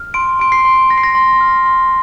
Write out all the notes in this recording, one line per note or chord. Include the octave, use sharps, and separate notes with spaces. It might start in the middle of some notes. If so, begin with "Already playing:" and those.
Already playing: F6
C6 D7
C6 D7
C7
C6
C6 A#6
C7
A#6
C6
F6
C6